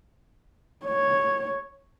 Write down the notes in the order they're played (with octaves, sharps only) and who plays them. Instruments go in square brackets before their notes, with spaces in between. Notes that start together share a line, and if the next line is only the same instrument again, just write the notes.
[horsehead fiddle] C#5